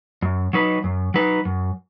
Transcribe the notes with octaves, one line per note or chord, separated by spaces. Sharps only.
F#2
F#3 D#4 B4
F#2
F#3 D#4 B4
F#2